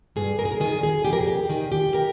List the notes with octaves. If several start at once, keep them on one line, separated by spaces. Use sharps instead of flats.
G2 G#4
A#4
G#4
A#4
D#3 G#4
G#4
F2 G4
A#4
G#4
G4
D#3 G#4
G4
A#4